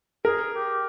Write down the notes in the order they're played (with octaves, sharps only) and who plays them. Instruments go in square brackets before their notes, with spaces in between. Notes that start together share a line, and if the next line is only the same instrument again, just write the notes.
[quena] G#4 [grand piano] A#4
[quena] G4